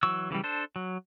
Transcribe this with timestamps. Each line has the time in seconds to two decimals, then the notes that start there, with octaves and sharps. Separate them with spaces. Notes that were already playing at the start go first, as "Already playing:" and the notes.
0.03 E3 F#3 C#6 E6
0.30 C#3 E3 F3 G3
0.44 D4 A4 C5
0.76 F#3